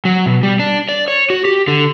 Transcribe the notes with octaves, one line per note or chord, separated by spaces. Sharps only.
F#3
B2
G3
D4
D5
C#5
F#4
G4
D3